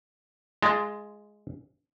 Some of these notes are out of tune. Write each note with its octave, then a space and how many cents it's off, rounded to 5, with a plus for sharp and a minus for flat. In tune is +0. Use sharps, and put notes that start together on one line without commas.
G#3 +5 F4 -20 A5 +30